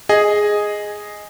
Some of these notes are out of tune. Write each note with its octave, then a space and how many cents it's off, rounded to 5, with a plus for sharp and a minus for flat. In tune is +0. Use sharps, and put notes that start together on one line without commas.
G#4 +0 D#5 +0